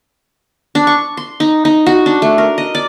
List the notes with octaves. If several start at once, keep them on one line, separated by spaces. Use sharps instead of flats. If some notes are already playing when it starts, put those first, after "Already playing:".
D4
C#6
C6
D#4
D#4
F#4
D4
A3
A#4
D#5
D5